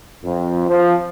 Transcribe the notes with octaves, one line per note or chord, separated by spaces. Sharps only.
F2
F3